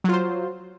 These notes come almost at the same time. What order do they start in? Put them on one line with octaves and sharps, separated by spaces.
F#3 F4 C5